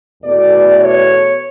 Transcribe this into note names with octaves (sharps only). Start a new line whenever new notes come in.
E2 B2 A3 D5
C#5